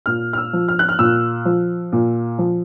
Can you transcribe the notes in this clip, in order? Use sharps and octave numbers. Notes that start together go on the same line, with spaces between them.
A#2 F6
F6
E6
F3
F6
F#6
F6
A#2 E6
F3
A#2
F3